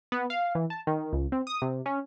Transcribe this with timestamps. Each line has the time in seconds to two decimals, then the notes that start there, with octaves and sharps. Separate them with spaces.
0.12 B3
0.30 F5
0.55 E3
0.70 A5
0.87 D#3
1.13 C#2
1.32 C4
1.47 D#6
1.62 C3
1.86 C#4